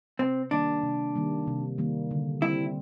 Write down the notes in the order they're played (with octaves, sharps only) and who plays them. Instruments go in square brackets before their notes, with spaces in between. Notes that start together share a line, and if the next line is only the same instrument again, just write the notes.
[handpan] C3 [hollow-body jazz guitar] C4
[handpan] D#3 G3 A#3 [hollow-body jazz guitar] D4
[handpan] C3
D#3 G3 A#3
C3
D#3 G3 A#3
D3
[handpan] G3 C4 [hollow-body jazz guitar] E4